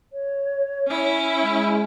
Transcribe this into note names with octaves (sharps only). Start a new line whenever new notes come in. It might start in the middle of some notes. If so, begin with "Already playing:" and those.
C#5
C#4 E4
G#3